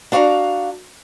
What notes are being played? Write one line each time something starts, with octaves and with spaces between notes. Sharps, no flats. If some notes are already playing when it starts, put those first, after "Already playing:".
D4 F#4 F5 A5 A#5